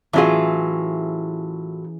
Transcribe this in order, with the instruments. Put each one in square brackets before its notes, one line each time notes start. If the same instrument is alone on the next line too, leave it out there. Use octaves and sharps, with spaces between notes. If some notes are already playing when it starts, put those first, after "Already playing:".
[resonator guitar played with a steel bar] A2 F#3 F4 [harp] E3 C#4 G#4